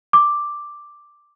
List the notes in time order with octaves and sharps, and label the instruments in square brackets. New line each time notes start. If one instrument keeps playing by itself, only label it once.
[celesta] D6